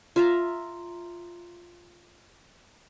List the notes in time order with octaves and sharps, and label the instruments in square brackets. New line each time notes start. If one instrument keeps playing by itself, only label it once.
[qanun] F4 E5 A#5